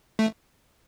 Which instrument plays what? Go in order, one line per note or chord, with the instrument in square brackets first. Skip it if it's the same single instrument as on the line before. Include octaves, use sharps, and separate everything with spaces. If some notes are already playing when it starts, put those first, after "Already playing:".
[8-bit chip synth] A3